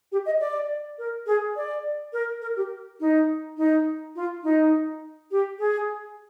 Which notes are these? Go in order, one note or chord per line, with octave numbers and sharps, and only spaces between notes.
G4
D#5
D5
A#4
G#4
D5
A#4
A#4
G4
D#4
D#4
F4
D#4
G4
G#4